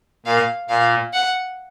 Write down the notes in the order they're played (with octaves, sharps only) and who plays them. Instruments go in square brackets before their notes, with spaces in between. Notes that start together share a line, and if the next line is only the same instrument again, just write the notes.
[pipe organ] A#2 [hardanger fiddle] F5
[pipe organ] A#2 [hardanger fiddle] F5
[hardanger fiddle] F#5